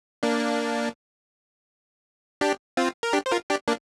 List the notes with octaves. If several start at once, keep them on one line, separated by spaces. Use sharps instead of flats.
A#3 D4
D4 G4
C4 F4
A#4
D4 G4
C5
F4 A#4
D4 G4
A#3 D4